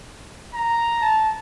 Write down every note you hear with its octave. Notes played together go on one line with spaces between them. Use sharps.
A#5
A5